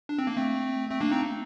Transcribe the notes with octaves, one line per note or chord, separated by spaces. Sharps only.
D4
C4
A#3
A3 C4
A3 C4
A#3 D4
C4 D#4